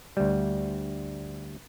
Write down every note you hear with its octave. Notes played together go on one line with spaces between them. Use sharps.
D2 G3